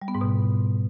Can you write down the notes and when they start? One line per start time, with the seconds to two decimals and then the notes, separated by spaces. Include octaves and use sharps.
0.02 G3
0.08 B3
0.15 G#2
0.21 B2